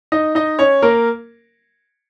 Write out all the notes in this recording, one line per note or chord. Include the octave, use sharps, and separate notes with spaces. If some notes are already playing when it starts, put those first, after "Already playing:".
D#4 D#5
D#4 D#5
C#4 C#5
A#3 A#4